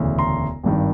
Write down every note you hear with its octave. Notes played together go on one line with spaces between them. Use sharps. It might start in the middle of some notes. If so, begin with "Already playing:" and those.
Already playing: E1 D2 C#3 E3
A#5 C6
G#1 G2 D#3